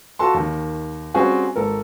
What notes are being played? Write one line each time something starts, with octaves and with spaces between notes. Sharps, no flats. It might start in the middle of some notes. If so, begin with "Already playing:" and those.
F4 F#4 A4 A5 C6
D#2 D#3
G3 C4 C#4 F4 F#4 G#4
G#1 A4 A#4